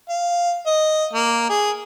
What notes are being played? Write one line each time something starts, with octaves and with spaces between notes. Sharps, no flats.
F5
D#5
A#3
G#4